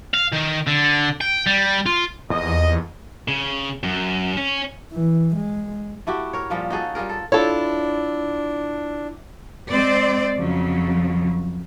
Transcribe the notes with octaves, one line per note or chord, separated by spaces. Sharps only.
F5
D#3
D3
G5
G3
F4
E2 D#5
C#3
F#2
C#4
E3
G#3
A3 E4 F#4 G4
A#4 C#5
A#2 F3 G3 C#4
D#4 F#4 G#4 A4
G3 F4 G#4 A#4
A4
D4 E4 F4 A4 C#5
G#3 C4 C5 D5
F2 C#3 F3 F#3